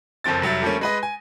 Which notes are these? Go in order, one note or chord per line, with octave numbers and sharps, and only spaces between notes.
F#1 F2 F3 C4 A6
F1 F#3 G3 E5 A6
D3 F3 G3 A3 A#3 C#4
G#3 B4 D#5
G#5